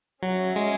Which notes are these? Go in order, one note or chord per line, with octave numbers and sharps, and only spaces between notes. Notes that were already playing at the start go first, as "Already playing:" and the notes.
F#3 C#4 G#4 C#5 E5
G#3